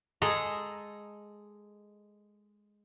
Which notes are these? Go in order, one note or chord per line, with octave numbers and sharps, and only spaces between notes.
G#3 G#4 A4 D#5 A#5